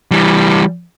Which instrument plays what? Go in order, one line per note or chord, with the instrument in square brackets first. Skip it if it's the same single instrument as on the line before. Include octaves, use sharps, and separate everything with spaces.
[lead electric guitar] E3 G3